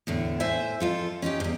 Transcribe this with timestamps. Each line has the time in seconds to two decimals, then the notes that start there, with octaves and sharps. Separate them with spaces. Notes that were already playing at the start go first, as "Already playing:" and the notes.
0.07 E2 A2 D3
0.40 A2 C5 E5 G#5
0.80 F2 F4 A4
1.22 C#4 D#4 E4 G4
1.40 E2 G2